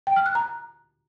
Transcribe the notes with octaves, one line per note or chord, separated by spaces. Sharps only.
G5
F6
F#6
A#5